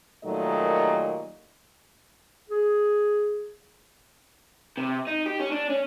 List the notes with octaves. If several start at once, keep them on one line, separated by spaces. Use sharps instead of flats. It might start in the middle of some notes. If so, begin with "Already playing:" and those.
A#2 D#3 F#3 G3 A3 D#5
G#4
C3
D#4
G4
C#4
D4
C#4